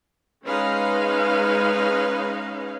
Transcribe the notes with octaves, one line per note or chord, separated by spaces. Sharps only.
G#3 C#4 D#4 B4 F5